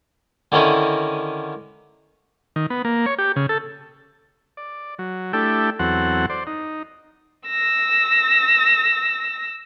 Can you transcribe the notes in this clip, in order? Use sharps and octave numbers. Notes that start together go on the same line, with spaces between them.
D3 D#3 C#4 D#4 E4
D#3
B3
A#3
C#5
G4
C#3
A4
D5
F#3
A3 D4 E4 G4 A4 G5
E2 F#3 C4 A4 F#5
C5 D5
D#4
E6 A#6